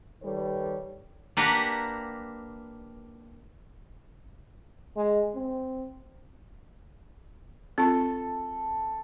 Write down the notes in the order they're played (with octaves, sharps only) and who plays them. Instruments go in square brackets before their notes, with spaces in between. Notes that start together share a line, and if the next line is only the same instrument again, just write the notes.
[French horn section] D#3 G3 A4 B4 C#5
[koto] A#3 D4 G4 A#4 B4 F#5
[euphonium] G#3
C4
[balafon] C4 F4 [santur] A4